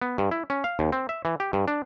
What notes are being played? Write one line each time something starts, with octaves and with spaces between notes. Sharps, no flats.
B3
G2
E4
C#4
F5
D#2
C4
E5
E3
G4
G2
D4